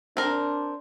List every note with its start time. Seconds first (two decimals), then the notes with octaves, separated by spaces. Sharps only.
0.17 C4 D4 A#4